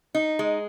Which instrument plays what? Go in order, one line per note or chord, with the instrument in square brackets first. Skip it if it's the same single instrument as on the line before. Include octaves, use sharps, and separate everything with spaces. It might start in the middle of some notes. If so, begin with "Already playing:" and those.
[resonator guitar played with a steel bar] D#4
G#3